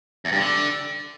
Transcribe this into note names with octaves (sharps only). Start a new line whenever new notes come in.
E2
G2
D3